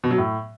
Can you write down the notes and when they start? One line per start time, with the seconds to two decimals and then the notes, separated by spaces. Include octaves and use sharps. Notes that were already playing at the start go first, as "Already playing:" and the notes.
0.04 B2
0.11 F#3
0.18 A2